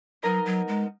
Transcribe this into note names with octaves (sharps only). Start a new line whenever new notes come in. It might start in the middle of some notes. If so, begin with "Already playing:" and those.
F#3 B3 D#4 A#4 D#5
F#3
G#3